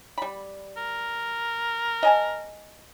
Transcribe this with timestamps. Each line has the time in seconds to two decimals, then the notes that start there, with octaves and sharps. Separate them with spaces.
0.18 G3 B5
0.77 A#4
2.03 D#5 G#5 A5